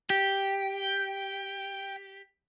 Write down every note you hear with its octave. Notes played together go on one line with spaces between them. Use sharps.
G4 G5